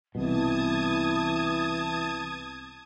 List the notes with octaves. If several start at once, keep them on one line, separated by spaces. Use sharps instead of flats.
C2 B2 E3 A5 D#6 G#6